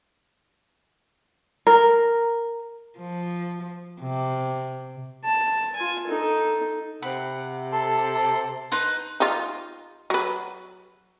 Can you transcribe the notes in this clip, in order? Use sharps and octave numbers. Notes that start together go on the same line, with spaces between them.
A#4
F3
C3
A5
F4 G#5
D#4 A4
C3 F#5 B5
A4 A5 C6
D#4 B4 C6 G6
D#4 F4
F#3 B4